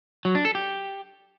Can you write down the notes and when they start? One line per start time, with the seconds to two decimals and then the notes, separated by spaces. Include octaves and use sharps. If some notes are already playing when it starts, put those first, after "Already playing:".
0.25 F#3
0.35 D4
0.45 A4
0.55 G4